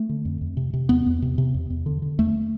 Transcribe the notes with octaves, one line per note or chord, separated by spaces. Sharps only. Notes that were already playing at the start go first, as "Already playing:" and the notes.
Already playing: A3
D3
F2
F2
C3
C3
E2 B3
E2
C3
C3
E2
E2
D3
D3
E2 A3